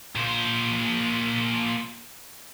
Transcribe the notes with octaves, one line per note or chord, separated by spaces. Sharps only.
A#2 C5